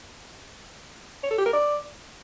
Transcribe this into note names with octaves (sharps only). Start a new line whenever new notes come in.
C#5
A4
G4
A#4
D5